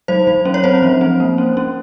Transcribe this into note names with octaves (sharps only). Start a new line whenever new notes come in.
F#3 C5
F#3
C#4
C#5
C4 C5
F3
C4
A#3
C#4
C#4